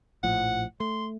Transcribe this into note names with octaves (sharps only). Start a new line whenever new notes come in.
A#1 A2 F3 F#5
A3 C6